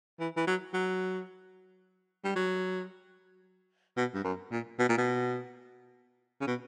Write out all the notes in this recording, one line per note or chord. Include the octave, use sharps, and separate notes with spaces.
E3
E3
F#3
F#3
G3
F#3
B2
G2
F#2
A#2
B2
A#2
B2
C#3
B2